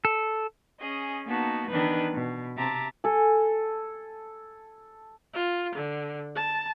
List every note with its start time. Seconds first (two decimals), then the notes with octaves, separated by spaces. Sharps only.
0.05 A4
0.80 C#4 G#4 D#5
1.27 A#3 B3 D#4 F#4 A5
1.69 D#3 E3 B3 D4 D#4 B4
2.13 B2
2.57 C3 C4 E5 A5 A#5 D6
3.04 A4 G#5
5.34 F4
5.75 D3
6.36 A5